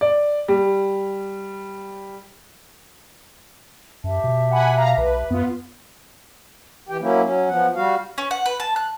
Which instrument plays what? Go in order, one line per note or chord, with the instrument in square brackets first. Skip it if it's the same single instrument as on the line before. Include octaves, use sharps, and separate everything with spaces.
[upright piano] D5
G3
[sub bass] F#2 [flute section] G4 E5 A5
[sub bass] B2
[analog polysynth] F#5 G#5 B5
F5 A#5
[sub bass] B1 [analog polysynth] B4
[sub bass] F#2 [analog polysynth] B3 F4
[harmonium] E3 G4 G5
F#3 A#3 C#4 E4
F#3 C#4
F3 B3 F#5
G3 F#4 F5
[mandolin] C#4
F#5
B4
A5
F#6